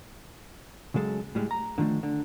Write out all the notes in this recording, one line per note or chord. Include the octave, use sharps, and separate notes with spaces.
C#3 F#3 G#3 A4
A2 G3 G#3
A#5
D3 D#3 F3 G#3 A3
D3